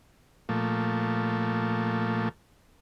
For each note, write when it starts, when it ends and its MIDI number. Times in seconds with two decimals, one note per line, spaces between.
0.49 2.29 46
0.49 2.29 53
0.49 2.29 57